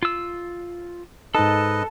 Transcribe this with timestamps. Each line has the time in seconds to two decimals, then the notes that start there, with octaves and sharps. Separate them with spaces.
0.03 F4 E6
1.35 G#2 D#4 A4 B4 D#5 A5